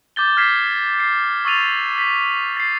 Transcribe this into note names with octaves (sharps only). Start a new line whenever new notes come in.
D6 G6 A6 G7
F6 G6 G#6 B6 C7 E7
C7
C#6 E6 A6 D#7 F7
A6 B6
A6 C7